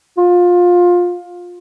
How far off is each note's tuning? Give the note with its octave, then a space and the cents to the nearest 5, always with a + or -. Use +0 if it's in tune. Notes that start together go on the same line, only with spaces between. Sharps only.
F4 +20